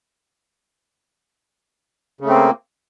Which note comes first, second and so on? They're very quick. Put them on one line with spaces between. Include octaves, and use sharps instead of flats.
C#3 A3 C4 A#3